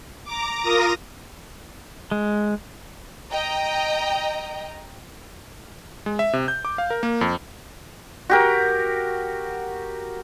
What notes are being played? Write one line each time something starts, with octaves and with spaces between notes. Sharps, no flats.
A#5 D6
F4 A#4 A#5 D#6 A#6
G#3
D#5 G5 A#5
G#3
E5
C3
G6
D6
F5
A#4
A#3
F2
F#4 G4 A#4